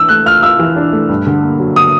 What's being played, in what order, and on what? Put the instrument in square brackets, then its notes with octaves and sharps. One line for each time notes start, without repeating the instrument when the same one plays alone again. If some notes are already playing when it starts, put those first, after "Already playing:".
Already playing: [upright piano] E3 D4 [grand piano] E6
[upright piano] A3 [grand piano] F#6
[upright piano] F4 [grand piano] F6
[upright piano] F4 [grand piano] E6
[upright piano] E3
D4
A3
G2
D3
A#3
F#3
[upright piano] D3 [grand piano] D#6